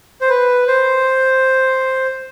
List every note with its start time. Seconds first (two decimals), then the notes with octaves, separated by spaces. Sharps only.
0.21 C5
0.29 B4
0.68 C5